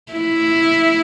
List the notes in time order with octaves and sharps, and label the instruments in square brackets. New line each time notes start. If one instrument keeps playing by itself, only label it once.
[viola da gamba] E4